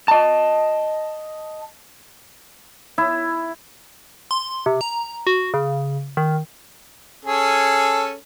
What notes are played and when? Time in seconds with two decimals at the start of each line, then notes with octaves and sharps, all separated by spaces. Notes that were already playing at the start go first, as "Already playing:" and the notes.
0.08 D#5 A5
2.98 E4
4.31 C6
4.66 C3
4.81 A#5
5.27 F#4
5.54 C#3
6.17 D#3
7.25 C#4 G#4 A4